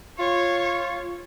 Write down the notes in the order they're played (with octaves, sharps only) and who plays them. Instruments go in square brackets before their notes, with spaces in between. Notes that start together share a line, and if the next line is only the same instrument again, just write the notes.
[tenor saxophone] F4 [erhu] C#5